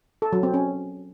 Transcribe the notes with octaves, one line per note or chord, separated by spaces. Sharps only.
A4
F#3
C4
C#4